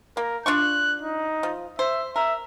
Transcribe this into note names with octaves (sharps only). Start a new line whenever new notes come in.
A#3 A#4
D4 F4 C#6 F#6
D#4
F3
C5 E5
A#4 E5